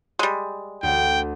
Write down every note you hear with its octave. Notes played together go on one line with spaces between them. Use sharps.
G3 G#3
D2 G5